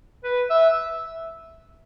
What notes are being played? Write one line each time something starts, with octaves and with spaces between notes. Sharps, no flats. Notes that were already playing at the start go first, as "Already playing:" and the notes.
B4
E5